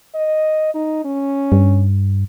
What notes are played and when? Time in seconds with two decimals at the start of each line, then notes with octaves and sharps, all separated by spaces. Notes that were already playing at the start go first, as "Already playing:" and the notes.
0.15 D#5
0.75 D#4
1.04 C#4
1.52 G2